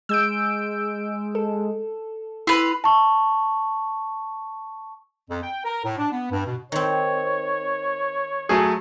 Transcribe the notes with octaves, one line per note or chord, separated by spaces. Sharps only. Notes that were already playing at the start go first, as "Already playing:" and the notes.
G#3 E6 G6 D7
A4
E4 B4 C6 F7
A5 C#6
F2
G5
A#4
A2
D4
B3
G2
B2
D#3 C4 C#5
F#3 A3 G#4